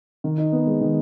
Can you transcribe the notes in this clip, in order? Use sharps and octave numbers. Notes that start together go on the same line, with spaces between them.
D#3
D#4
B3
G#3
D#3